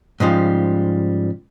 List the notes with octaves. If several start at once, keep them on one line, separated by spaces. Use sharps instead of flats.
G#2 C#3 F3 G3